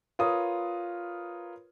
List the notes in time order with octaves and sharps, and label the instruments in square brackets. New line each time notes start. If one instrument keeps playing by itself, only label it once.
[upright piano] F4 A#4 B4 C#5 D#6